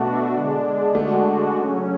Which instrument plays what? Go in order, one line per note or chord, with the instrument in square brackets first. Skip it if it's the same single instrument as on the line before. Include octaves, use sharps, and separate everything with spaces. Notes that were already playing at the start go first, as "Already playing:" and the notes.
Already playing: [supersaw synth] B2 A3 D4 F#4 [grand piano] B3
[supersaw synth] D3 G#3 D4
[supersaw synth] D3 G#3 D4 F#4 [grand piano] A3
[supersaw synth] C#3 F#3 C#4